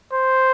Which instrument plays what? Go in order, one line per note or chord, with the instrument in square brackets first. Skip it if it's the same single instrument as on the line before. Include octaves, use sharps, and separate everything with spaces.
[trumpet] C5